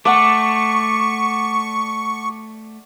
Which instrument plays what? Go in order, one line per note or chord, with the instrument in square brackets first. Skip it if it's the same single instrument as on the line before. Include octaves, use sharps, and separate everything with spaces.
[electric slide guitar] A3 [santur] D5 F#5 [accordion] C#6